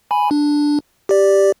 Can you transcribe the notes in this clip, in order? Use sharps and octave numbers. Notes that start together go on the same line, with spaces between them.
G#5 B5
D4
G4 D5